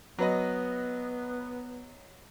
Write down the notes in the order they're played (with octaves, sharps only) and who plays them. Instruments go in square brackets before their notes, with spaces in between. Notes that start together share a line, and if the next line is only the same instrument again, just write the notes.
[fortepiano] F#3 B4 D#5 [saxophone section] B3